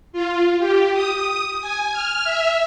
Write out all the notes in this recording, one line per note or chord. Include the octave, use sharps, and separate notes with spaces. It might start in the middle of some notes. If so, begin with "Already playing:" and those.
F4
G4
D#6
G#5
F6
E5